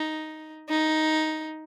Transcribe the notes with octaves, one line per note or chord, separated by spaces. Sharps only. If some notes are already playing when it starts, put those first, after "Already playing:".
Already playing: D#4
D#4